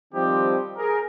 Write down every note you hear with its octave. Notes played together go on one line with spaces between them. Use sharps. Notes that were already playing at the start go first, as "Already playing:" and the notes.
D#3 F3 G3 C4 D#4 G4
G#4 A#4